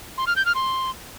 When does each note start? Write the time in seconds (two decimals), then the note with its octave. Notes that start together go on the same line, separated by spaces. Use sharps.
0.18 C6
0.27 F6
0.36 G6
0.46 F6
0.55 C6